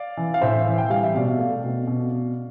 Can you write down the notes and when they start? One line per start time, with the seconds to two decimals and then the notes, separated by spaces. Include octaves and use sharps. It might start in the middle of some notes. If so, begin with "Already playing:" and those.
Already playing: D5 F5
0.17 E3
0.34 F5
0.41 A2 C5 E5
0.66 E3
0.78 G5
0.90 G3 F5
1.03 E5
1.15 B2 D5 F5
1.39 A3
1.64 B2
1.87 B2
2.11 B2